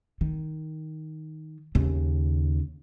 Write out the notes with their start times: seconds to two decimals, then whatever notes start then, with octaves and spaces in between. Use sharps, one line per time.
0.21 D#3
1.75 D#2 C#3